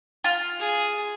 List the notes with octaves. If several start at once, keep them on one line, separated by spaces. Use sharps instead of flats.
F4
G#4